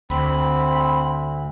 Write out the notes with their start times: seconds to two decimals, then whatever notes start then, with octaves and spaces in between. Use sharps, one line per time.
0.10 D2 C4 B5